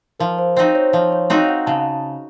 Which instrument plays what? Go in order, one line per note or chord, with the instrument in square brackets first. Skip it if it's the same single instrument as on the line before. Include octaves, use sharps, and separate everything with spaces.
[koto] F3 [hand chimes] A#4
[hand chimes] C5
[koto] C4 D#4 F#4 [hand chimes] C5
[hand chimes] C#5
[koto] F3 [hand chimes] C5
[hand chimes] C#5
[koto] C4 D#4 F#4 [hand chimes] F5
[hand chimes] F5
F#5
[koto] C#3 [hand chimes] A5